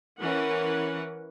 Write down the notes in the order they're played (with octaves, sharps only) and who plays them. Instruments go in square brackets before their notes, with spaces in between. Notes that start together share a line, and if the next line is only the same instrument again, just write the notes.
[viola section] E3 C#4 A#4 B4 F#5